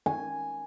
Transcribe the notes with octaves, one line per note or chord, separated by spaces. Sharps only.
G#5